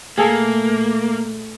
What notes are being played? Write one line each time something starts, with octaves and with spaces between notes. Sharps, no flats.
A#2 A3 A#3 G#4 A4